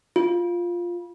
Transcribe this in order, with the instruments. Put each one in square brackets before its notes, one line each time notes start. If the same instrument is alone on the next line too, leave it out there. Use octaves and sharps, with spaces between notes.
[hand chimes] F4